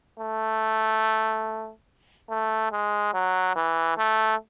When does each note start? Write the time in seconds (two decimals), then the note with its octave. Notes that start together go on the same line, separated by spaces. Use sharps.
0.20 A3
2.30 A3
2.72 G#3
3.14 F#3
3.56 E3
3.98 A3